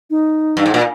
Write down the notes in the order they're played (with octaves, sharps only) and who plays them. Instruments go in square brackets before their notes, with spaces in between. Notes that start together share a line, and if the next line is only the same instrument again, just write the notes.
[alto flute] D#4
[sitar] G2
G#2
A#2